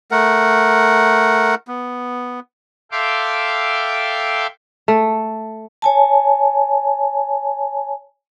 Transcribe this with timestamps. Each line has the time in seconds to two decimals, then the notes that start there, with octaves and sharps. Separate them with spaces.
0.11 A3 A#4 F#5
1.68 B3
2.92 A4 E5 F5 G5 C6 D6
4.88 A3
5.82 C#5 G#5 A5